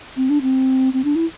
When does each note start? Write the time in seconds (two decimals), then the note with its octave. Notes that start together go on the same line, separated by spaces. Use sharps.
0.17 C4
0.30 D4
0.42 C4
0.94 C4
1.04 D4
1.15 E4